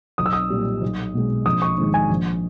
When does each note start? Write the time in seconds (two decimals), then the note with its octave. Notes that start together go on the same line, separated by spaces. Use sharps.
0.18 B1 D#6
0.26 E6
0.33 D#6
0.50 A#2 G3
0.82 B1
1.14 B2 G#3
1.46 A#1 D#6
1.62 C#6
1.78 G#2 D#3 G#3
1.94 G#5
2.09 A#1